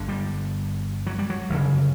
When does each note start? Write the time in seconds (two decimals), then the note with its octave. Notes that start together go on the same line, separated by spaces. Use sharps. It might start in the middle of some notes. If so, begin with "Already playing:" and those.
Already playing: G1 G2 D3
0.09 G3
1.07 F#3
1.19 G3
1.30 F#3
1.50 G1 F#2 C#3